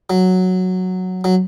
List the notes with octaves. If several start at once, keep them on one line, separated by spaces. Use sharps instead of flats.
F#3
F#3